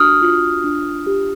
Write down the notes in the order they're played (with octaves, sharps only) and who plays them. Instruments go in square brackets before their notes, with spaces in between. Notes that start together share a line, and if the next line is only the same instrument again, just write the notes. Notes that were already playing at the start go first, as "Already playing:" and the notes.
Already playing: [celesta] D4 F#4 D#6 F6
F4
D4
G4